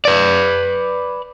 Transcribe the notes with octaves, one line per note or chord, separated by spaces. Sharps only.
B4 D5